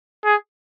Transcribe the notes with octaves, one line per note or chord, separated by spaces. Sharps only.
G#4